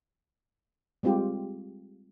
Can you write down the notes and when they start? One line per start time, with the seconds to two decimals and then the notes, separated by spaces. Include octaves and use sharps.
1.03 G3 G#3 C4 F4 G4